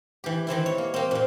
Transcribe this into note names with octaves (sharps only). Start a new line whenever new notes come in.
E3 G4
D#3 E3 C4 E4
C#5
A#3
A#3 C4
A#2 C4